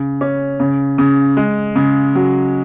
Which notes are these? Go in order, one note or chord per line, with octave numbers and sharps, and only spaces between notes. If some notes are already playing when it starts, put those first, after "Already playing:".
Already playing: C#3
C#4
C#3
C#3
G#3
C#3
F#3